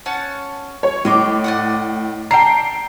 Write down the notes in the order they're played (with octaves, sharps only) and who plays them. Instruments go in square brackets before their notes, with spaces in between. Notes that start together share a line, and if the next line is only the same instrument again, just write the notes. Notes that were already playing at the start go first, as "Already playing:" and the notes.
[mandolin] C#4 F#5 A5
[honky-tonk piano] C#5
[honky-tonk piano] A2 [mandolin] D#5 C6 D6
[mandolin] D5 D#5 F#5
[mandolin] D5 A5 A#5 [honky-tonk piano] G5 C7